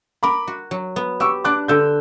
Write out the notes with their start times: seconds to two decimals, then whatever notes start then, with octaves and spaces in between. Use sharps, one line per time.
0.23 A#4 B5 D6
0.48 F#4
0.71 F#3
0.96 B3
1.20 G4 C#6 E6
1.44 D4 D6 F#6
1.68 D3 E6 G6